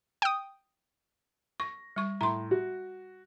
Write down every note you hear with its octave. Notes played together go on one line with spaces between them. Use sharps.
G5 D#6
C#6 A#6
G3 C#6
A2 A#5 C6
F#4